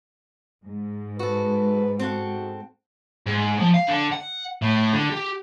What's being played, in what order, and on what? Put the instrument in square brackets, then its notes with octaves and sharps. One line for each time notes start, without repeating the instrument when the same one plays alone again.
[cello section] G#2
[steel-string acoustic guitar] F#4 A4 [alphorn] B4
[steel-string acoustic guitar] C4 A4 F#5 [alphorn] F#4
[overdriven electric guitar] G#2
F3
F5
D3
F#5
A2
D3
G4